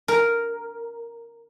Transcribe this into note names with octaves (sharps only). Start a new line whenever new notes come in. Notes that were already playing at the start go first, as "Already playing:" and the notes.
A#4